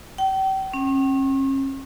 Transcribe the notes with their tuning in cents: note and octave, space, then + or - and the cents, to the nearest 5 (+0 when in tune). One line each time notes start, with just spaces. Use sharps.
G5 -40
C#4 -40